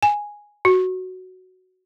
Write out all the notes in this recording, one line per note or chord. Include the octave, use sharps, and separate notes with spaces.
G#5
F#4